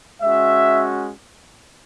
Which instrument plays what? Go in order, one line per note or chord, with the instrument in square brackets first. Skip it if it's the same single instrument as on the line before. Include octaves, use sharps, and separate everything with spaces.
[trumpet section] G#3 C#4 F#4 E5